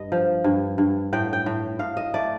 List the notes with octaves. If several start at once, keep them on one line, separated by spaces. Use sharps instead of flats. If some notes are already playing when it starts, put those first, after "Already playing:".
Already playing: G2 D#5
F3
G2
G2
A2 G5
G5
A2
A2 F5
D#5
A3 D5